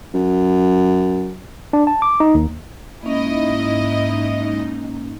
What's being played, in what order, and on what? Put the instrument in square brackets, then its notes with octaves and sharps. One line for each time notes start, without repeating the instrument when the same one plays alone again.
[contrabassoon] F#2
[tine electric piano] D4
A5
D6
D#4
D#2
[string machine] G#2 D#4 [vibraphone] A#3 C#4 [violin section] E4 D#5